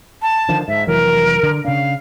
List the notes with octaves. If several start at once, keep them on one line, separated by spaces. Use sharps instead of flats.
A5
D3 D#3 F3
G#2 E5
F1 E3 F#3 A#4
D3
C#3 D4 F5